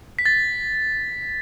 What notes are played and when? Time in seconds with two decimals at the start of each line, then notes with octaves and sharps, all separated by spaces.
0.19 B6
0.26 A6